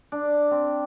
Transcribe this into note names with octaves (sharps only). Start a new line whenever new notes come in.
D4
C4